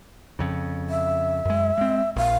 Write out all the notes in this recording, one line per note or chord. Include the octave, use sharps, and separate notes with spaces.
F2 C#3
E5
F#2 G#3
G#3 C4
A#1 F5